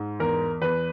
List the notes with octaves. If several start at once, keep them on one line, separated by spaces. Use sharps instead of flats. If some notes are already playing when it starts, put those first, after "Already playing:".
Already playing: G#2
E2 A#4
E2 B4